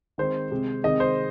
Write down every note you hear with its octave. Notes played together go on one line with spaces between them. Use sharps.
D#3 G#3 C4 C5
C3 G#3 C4
C3 D#3 G#3 C4 D#5
C5